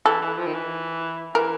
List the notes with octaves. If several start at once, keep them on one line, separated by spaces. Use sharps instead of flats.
E3 A4
E3
F3
D#3
E3
E3 A#4